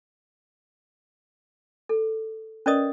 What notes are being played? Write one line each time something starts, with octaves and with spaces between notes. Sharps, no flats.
A4
C#4 A#4 B4 D5 D#5 D#6